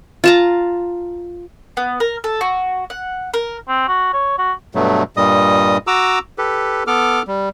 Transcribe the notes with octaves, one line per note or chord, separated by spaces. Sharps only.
F4 A5 A#5
B3
A#4
A4
F#4
F#5
A#4
C4
F#4
C#5
F#4
G2 B2 F#3 A3
G2 A#2 G3 D#5 D#6
F#4 A#5 D6 E6
G4 A4 B4
B3 A4 D6 F6
G3